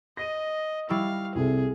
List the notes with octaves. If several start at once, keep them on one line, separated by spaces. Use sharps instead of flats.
D#5 A#6 D#7
G3 E4 F5 C#6 E6
C2 C3 G#4 A4